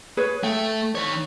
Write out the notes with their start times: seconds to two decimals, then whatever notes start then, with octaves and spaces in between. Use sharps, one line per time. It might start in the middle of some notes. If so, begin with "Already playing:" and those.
0.17 G#4 B4 C#5
0.43 A3 G5
0.95 D#3 C#5